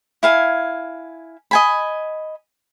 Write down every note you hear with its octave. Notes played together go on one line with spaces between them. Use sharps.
E4 F5 G#5
D#5 G#5 B5